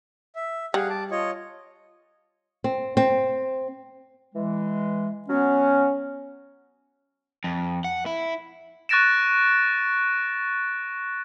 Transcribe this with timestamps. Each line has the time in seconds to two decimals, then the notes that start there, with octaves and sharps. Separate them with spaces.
0.36 E5
0.74 G3 G#4 F5 F#5
0.90 A5 D6
1.11 F4 C#5 D#5
2.64 C4
2.97 C4
4.35 E3 G#3
5.28 F#3 B3 C#4
7.44 F2
7.84 F#5
8.06 E4
8.89 C#6 F#6 A6 A#6 D7 E7